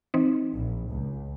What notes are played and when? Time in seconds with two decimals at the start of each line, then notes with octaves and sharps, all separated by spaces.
0.14 E3 C4 D#4
0.54 A#1
0.90 C#2